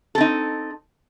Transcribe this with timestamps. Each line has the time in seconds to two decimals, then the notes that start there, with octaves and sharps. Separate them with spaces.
0.15 A4
0.18 C4
0.21 D#4